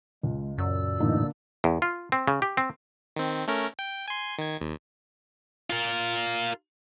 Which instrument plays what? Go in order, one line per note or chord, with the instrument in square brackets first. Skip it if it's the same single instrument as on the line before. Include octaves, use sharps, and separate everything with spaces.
[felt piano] C#2 [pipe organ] G#3
[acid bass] F#2 [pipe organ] A#2 D5 E6
[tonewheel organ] A2 E3 D#4 [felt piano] D3 A#3
[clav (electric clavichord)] E2
F4
C4
C#3
G4
C4
[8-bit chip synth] D#3 C4
A3 C#4 A#4
G5
G#5 C6
D#3 G#6
D#2
[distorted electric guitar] F4 A#4